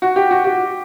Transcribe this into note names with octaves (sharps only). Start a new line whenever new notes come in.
F#4
G4
F#4
G4